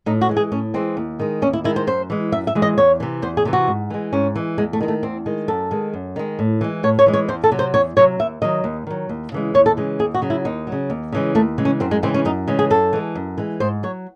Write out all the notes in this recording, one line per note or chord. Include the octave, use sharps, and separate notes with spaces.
A2 D#4
F#4
E3 G#3
G#4
A2 C#4
E3 G#3 C4
D#2
D#3 G#3
D#2 C#4
E4
D#3 G#3 E4
C5
F#2 C5
E3 G#3
F#2 E5
E5
E3 G#3
D#5
E2 C#5
C3 E3
E2 C5
G#4
C3 E3
F#4
G#2
E3 G#3
G#2 C#4
E3 G#3
E2 G#3
A3
D#3 G#3
A3
E2 C4
D#3 G#3
F#2 A4
D#3 G#3
F#2
D#3 G#3
A2
E3 G#3
A2 C#5
C#5
E3 G#3
C#5
E2 C5
A4
C3 F#3
C5
E2 C#5
C3 F#3 C#5
D#2 E5
D#3 F#3 D#5
D#2
D#3 F#3
D#2
C#3 E3 G#3
D#2 C#5
A4
C#3 E3 G#3
D#2 G#4
F#4
C#3 F#3
E4
D#2 D#4
F#3
C#3
D#2
C#3 E3 G#3
D#2 A3
C#3 E3 G#3
C#4
F#2 C4
G#3
C#3 E3 G#3 C4
C#4
F#2 D#4
C#3 E3 G#3
G#4
F#2 A4
E3 G#3
F#2
E3 G#3
G#2 C5
F#3 C#5